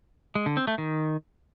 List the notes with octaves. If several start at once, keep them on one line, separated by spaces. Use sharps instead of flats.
G#3
D3
C4
A3
D#3